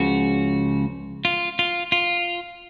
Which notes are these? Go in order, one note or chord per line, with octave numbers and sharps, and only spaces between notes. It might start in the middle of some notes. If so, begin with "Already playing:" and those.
Already playing: C#2 C#3 F3 F#4
F4
F4
F4